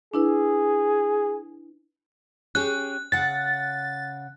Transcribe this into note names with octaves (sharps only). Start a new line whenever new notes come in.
D4 E4 G#4 B4
C#4 G4 G#4 F#6
C#3 F#5 A6